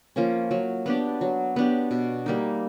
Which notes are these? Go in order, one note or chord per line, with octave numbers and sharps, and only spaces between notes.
F3 A#3 C#4
F#3
B3 D4 G4
F#3
B3 D4 G4
B2
G3 A#3 D#4